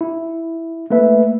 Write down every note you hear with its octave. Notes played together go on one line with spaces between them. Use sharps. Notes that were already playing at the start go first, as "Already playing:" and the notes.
E4
A3 A#3 B4 E5